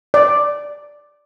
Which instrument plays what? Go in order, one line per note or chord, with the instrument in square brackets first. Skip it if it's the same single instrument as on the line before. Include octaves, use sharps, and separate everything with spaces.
[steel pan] D5